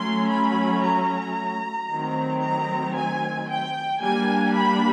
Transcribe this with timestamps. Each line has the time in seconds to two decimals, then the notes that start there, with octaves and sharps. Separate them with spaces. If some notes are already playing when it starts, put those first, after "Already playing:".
Already playing: F#3 A3 C#4 C6
0.29 B5
0.84 A#5
1.90 D#3 F#3 A3 C4
2.43 A#5
2.96 G#5
3.49 G5
4.01 G3 A#3 D4 G#5
4.56 B5